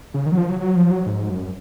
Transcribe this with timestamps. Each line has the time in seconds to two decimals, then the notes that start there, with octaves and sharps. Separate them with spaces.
0.14 C#3
0.26 D#3
0.32 F#3
0.37 F3
0.49 F#3
0.60 F#3
0.76 F3
0.91 F#3
1.06 G#2
1.29 F#2